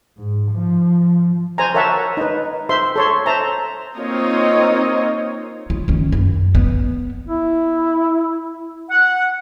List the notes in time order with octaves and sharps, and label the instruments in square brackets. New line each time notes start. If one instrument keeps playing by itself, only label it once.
[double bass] G#2
F3
[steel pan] C5 G#5 A#5
A#4 C#5 E5 F#5 A5
D#4 B4
C5 E5 C6
A4 C#5 C6
C5 E5 A5 A#5
[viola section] A#3 C4 D#4 F4 C#5 D#5
[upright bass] F4
D#3 C#4
F#2
B3
[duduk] E4
[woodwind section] F#5